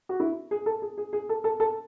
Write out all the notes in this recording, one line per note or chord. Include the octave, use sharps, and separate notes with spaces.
F#4
E4
G#4
A4
G#4
G#4
G#4
A4
A4
A4